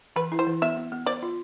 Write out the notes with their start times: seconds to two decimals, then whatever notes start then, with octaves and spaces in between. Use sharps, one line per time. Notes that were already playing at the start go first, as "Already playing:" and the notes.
0.16 E3 B4
0.32 E4
0.39 C5
0.47 E3
0.62 B3 E5
0.77 B3
0.92 B3
1.06 C5 D5
1.23 F4